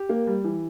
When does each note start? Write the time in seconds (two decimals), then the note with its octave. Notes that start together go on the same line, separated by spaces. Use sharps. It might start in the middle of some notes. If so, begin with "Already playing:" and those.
Already playing: G4
0.09 A#3
0.27 G3
0.44 E3